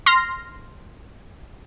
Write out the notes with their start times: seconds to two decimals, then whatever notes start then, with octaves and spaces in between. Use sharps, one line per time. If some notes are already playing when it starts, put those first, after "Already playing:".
0.06 C6 F6 A#6